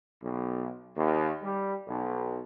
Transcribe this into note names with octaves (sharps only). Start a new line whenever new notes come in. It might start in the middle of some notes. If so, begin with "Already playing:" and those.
B1
D#2
G3
B1